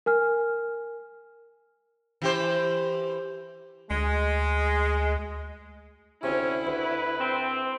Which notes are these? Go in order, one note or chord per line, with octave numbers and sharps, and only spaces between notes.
A#4 G#5 F6
E3 G4 C5
D2 G#3
D2 C3 C#4 E4
D2 B4
C4